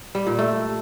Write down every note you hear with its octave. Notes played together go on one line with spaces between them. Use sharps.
G3
A#2
A3